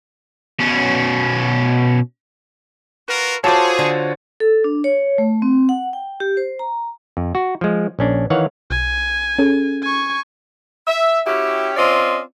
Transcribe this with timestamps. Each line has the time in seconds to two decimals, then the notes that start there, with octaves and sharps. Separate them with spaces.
0.60 B2 C#4
3.08 F4 F#4 A#4 B4
3.44 F4 F#4 G#4 A4 C5 C#5 A5 D6
3.79 D3
4.40 A4
4.64 D4
4.84 C#5
5.18 A3
5.42 C4
5.69 F#5
5.93 G5
6.20 G4
6.37 C5
6.59 A#5
7.17 F2
7.35 F#4
7.61 F3 G#3
7.99 A#1 C#4 D4
8.30 D#3 E3 C#5 F5 F#5
8.71 B1 G#5
9.39 C#4 G#4 A4
9.82 G#5 C#6
10.87 E5
11.26 C#4 E4 F#4 G4
11.77 C4 C#4 F4 D5 D#5